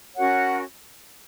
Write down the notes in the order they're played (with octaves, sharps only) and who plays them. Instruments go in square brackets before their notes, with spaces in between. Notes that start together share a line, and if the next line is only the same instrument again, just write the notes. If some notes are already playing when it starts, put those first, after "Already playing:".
[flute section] C#4 F#4 A#4 C#5 F#5